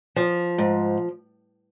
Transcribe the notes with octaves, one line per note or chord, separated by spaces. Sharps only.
F3
G#2